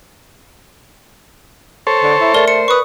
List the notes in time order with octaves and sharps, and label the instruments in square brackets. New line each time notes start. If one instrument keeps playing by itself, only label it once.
[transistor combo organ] A4 C5 C#5
[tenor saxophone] D3
E4
[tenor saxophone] A3 [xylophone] A#4 D5 G7
[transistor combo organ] C5 [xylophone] C#7
[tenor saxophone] B4 [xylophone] C#6 D#6